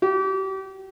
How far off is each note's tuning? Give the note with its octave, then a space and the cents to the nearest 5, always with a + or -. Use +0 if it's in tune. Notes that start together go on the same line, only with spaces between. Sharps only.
G4 -35